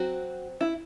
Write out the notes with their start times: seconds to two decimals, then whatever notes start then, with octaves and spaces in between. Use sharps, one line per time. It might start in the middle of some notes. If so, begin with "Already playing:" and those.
Already playing: F#3 C4 F#4
0.61 E4